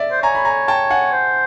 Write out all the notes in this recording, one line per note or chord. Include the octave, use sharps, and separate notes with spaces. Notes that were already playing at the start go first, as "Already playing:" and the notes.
Already playing: D5 E5
C5
C#5 G#5 A#5
B5
G#5 A#5
G5 A5
F#5 G#5
C5